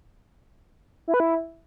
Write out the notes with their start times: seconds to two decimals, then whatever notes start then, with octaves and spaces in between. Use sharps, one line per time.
1.08 E4
1.14 B4
1.20 E4